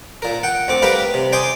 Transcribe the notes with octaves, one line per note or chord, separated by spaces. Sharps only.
A#2 A#4
F#5 G5
D2 C4 D6
G3 G4 A#4 B4 F5 B5
C3
D5 G5 G#5 C6 D#6